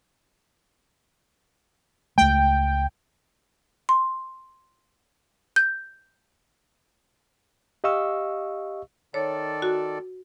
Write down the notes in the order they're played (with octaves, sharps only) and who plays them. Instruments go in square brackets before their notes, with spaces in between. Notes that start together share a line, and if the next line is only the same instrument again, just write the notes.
[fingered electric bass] C#2 A3 [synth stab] G5
[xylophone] C6
G6
[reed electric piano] G4 D#5 F5 C#6 E6
[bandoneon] D#3 A4 D5 [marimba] C#5
[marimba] F#4